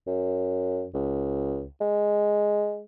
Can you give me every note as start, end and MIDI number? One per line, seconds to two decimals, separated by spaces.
0.07 0.87 42
0.94 1.66 37
1.81 2.82 56